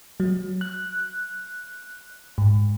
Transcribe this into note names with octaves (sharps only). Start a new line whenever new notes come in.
F#3
F#6
G#2